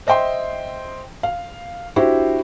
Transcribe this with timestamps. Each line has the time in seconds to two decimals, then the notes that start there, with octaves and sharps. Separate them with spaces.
0.07 C5 D#5 E5 G5 C6
1.23 F5
1.96 D4 E4 F#4 G4 C5